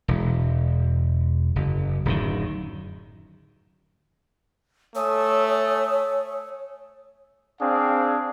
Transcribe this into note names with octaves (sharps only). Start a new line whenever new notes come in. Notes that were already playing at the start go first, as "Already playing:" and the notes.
E1
F#1
D1 F#2 D#3
A3 C#5 G#5 D#6 E6
C4 D4 G#4 F5